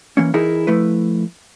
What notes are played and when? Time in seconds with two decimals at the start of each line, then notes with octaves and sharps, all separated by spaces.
0.17 E3 A#3 C#4
0.34 E3 D#4 E4 G#4 A#4
0.67 F3 A3 E4 B4